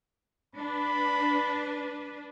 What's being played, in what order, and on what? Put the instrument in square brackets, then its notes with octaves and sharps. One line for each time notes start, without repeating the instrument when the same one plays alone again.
[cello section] D4 B4 [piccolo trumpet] B5